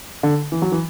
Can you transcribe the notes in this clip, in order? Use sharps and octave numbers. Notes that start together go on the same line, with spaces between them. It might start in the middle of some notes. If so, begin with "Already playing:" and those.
D3
E3
F#3
E3